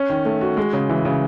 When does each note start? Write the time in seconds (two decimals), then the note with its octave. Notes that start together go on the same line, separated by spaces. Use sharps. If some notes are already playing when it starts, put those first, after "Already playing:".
Already playing: C#4
0.10 D#3
0.25 A3
0.41 F#4
0.57 G#3
0.73 C#3
0.89 E3
1.05 C#3